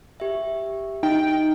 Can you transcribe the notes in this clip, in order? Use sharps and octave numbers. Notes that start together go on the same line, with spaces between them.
G4 E5
D#4 G5